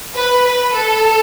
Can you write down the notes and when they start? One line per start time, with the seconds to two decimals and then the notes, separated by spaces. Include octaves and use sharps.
0.14 B4
0.44 B4
0.73 A4